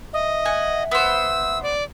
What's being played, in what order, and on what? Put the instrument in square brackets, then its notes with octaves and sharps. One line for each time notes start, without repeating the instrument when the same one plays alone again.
[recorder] D#5 [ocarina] E5
[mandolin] F#5 G#5
[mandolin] B3 C5 [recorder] E6
[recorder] D5